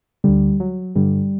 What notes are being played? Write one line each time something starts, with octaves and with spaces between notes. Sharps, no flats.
D2 D3 G3
F#3
G2 D3 G3